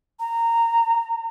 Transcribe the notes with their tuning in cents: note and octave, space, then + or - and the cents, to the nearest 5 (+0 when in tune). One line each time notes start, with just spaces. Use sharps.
A#5 -15